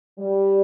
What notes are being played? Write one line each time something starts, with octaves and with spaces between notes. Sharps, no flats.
G3